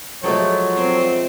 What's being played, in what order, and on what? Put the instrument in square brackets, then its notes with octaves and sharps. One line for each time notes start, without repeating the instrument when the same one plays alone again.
[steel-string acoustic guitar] F3 G#3 A3 [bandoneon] F#3 [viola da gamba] F#4 [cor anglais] C#5
[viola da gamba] C4 C5